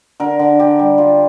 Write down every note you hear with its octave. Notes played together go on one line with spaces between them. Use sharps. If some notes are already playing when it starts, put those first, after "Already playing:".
D3 A#4
D3
D3 G4
G3
G3 F4